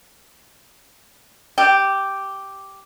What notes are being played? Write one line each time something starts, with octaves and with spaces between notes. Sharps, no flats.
G4